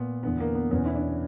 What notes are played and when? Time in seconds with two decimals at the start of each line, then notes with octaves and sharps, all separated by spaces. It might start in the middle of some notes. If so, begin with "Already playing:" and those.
Already playing: A#2 B3
0.23 E2 D3 B3
0.40 A#3
0.55 B3
0.71 E2 B2 C#4
0.86 E4
0.96 D4